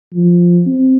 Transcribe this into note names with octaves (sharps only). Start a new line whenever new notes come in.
F3
C4